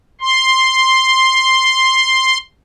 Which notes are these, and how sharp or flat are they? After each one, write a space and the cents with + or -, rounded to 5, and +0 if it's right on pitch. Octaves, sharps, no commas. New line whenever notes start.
C6 +5